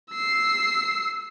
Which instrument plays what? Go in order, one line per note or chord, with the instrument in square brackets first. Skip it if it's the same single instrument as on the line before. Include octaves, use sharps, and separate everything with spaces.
[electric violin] E6 C7